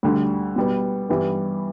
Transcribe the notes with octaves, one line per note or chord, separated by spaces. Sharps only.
D2 D3 G3
B2 G3 B3
G2 E3 G3 B3